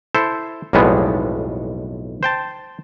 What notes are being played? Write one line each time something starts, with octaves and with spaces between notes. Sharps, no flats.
E4 A4 C5
B1 F2 A2 G3 G#3 B3
C5 G5 A5